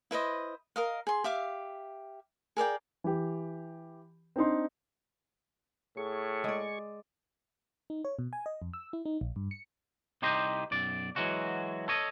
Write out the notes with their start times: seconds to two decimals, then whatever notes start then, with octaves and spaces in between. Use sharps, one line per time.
0.11 E4 B4 C5 D#5
0.76 A#4 D#5 F5
1.07 G#4 C6
1.24 G4 E5 F5 D6
2.57 G#4 A#4 D5 G5
3.04 E3 G4
4.36 C4 D4 D#4 C6
5.97 A2 G#4 C#6
6.44 G#3 D5
7.90 D#4
8.05 C#5
8.19 B2
8.33 G#5
8.46 D#5
8.62 F2
8.73 E6
8.93 E4
9.05 D#4
9.21 A#1
9.36 G2
9.51 C#7
10.22 C2 D#4 G4 C5 D#5
10.71 B1 F#2 D5
11.16 E3 F#3 G#3 F#4
11.88 A4 C#5 D#5